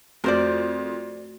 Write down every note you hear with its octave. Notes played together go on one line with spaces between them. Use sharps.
F2 A3 F#4 A#4 C5 D5